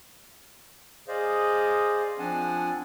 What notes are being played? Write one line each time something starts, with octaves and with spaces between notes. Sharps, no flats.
G#4 C5 D5 D#5 F5
F3 C4 D4 F#5 G#5 A5